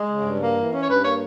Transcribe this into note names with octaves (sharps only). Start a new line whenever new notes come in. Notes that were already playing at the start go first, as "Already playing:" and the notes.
Already playing: G#3
C#3
G2
A#3
E3
C#4
C#5
G2 B4
A#3 C#5